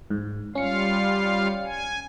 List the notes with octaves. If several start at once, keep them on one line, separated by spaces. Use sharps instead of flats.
G#2
G3 C#4 F4 F5 C#7
G#5